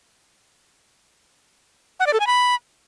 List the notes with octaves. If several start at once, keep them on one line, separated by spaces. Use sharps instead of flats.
F#5
D5
A4
G#5
B5